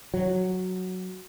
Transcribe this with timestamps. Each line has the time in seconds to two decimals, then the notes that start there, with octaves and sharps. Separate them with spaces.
0.14 F#3